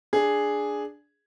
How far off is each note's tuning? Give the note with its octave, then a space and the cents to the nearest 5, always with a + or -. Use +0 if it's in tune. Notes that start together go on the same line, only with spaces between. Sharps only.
D4 +0 G#4 +0